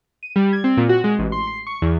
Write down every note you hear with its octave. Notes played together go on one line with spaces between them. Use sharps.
D#7
G3
G#6
C4
A#2
F#4
G#3
A1
C6
C7
C#6
E2